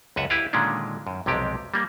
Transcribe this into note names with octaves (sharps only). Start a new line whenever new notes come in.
C#2 F#2 B4 E5 F#5
E4 G4 B4 D5 F5
A#2 D3 D#3 G#3 C#4 D4
F#2
B1 F2 C3 G#3 G4 D5
G3 A#3